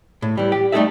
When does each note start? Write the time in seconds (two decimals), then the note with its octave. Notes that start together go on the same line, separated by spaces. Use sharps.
0.22 A2
0.37 E3 G3
0.52 G4
0.72 G3 A3 D#4 G#4 A4 E5